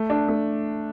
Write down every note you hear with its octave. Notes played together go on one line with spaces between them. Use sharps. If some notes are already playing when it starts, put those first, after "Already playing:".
Already playing: A3
D4
A3